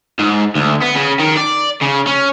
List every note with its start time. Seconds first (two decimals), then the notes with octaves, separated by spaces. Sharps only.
0.19 G#2
0.55 D2
0.82 B3
0.95 C#3
1.19 D#3
1.37 D5
1.82 C#3
2.07 C#4